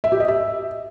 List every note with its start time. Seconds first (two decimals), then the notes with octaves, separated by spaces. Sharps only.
0.04 E5
0.12 G4
0.20 D#5
0.28 E5